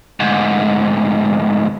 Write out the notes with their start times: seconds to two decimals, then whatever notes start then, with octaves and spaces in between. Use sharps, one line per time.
0.20 D2 G#2